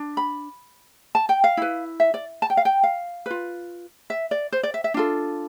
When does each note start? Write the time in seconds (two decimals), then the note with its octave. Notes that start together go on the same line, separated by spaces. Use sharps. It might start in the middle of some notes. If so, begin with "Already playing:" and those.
Already playing: D4
0.17 B5
1.15 A5
1.29 G5
1.44 F5
1.57 E4 B4
2.00 E5
2.14 D5
2.42 A5
2.50 G5
2.57 F5
2.65 G5
2.83 F5
3.26 F4 B4
4.10 E5
4.31 D5
4.52 C5
4.63 D5
4.74 E5
4.84 E5
4.94 D4 F4 A4